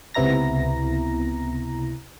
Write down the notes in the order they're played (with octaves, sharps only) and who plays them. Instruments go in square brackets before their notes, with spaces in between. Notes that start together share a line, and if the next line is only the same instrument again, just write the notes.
[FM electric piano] C#2 C3 B3 E4 A#5 A#6